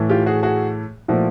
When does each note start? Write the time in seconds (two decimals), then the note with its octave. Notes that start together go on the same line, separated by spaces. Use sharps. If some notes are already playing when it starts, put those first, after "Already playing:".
Already playing: A2 E3 A3
0.10 F4 G4
0.26 F#4 G#4
0.42 F#4 G#4
1.08 A#2 F3 A3 E4 F#4